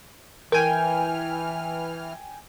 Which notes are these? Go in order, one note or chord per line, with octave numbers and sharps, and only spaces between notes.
E3 A#4 G5 G#5 F6